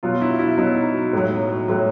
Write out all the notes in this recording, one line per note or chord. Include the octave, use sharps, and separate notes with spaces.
B2 F#3 F4
E4
E4
B2 F#3 D#4
A2 F#3
A2 F#3